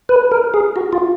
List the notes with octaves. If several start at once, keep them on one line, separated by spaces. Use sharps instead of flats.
B4
A#4
G#4
F#4
F4